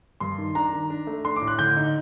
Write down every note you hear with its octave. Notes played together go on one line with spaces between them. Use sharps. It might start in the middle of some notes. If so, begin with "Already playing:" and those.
G2 C6
D#3
D4 A#5
D#3
D4
A3
D4 C6
D6
A2
F#6
D3 G6
D#4